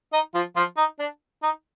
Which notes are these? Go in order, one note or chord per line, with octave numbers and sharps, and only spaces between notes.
D#4 D#5
F3 F4
F3 F4
D#4
D4
D#4